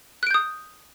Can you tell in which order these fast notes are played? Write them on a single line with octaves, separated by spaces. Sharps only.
F#6 D7 G6 D#6